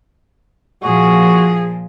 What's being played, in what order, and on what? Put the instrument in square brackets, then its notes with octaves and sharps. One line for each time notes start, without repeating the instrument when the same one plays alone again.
[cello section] A#2 F3 [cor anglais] F#4 [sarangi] G#4